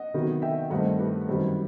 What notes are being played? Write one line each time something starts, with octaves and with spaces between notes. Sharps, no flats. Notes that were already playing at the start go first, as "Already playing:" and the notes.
Already playing: D#5 F#5
C3 D#3 F#3 B3
E5 G5
G2 D#3 A3 C4 D#5 F#5
G4 B4
F#2 D#3 G3 C4